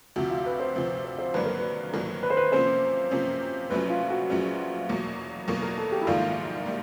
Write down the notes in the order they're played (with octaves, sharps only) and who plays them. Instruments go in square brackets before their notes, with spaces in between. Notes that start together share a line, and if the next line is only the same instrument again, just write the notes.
[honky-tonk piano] D2 C3 F3 [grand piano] F#4
[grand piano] F4
B4
C5
[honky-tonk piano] D2 C3 F3 [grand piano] B4
[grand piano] C5
C5
[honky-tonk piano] G#1 G2 D3 F#3 A#3 [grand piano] B4
[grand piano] A#4
B4
[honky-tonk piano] G#1 G2 D3 F#3 A#3 [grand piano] A#4
[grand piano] B4
C5
B4
[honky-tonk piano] C3 F3 A#3 C#4 [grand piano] C5
[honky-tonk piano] C3 F3 A#3 C#4
[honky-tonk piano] A#1 A#2 F#3 A3 C#4 [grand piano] B4
[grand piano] F4
F#4
[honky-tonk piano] A#1 A#2 F#3 A3 C#4 [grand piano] G#4
[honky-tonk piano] E2 B2 F#3 A#3
[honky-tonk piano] E2 B2 F#3 A#3 [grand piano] A#4
[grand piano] A#4
A4
G4
E4
[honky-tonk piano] A#1 G#2 D#3 G3 A#3 [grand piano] F4
[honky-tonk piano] G3 A#3